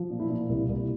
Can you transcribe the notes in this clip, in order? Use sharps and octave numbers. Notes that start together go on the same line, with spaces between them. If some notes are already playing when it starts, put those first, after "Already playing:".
Already playing: F3
A#2
E4
A#2
C2
C2